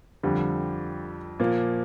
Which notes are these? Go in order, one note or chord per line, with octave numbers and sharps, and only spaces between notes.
F2 D3 G3
A#2 F3 A#3